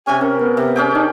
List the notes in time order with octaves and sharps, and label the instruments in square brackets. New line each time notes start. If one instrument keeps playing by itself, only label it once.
[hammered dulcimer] C3 C#4 [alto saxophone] G#5
[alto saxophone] C#4 [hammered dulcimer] A#4
[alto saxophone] B3
[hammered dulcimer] C3
C#4 G#4 G5
[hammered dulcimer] D4 [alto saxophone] D#4